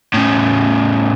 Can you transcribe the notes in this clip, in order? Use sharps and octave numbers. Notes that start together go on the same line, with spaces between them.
A2 C#3